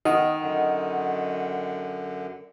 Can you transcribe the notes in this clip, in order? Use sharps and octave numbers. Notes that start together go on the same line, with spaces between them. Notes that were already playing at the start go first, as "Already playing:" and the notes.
D#3 D#5 F#5
F#2 D3